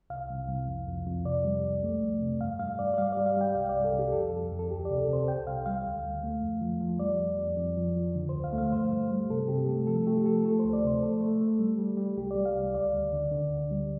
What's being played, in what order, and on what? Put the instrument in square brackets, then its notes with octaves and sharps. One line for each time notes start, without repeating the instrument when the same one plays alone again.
[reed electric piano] C2 F5
C2
C2
F2
F2
F2
C3 D5
G3
C2
A3
F2
C3
G2 F5
G2 F5
G2 D5
D5
G3 F5
G3 D5
F5
G3 G5
C2 F5
D5
C2
A4
C2
G4
F2 A4
F2
F2
A4
D2 G4
C3 D5
A4
C3
C5
C2 G5
C2 F5
G3 F5
D2
D2
A3
F2
F3
F3
G3 D5
F2
F2
F2
F3
F3
D3
D2 C5
F5
A3
F5
G2 C5
G2
G3
C3 A4
C3 G4
A3 A4
F3 A4
A3 G4
F3 A4
A3 A4
C5
D2
D5
C3 C5
A3 A4
A3
A3
G3
G3
G3
C2 G4
G3 D5
F5
C2
D2 D5
D2
D3
D3
D2
G3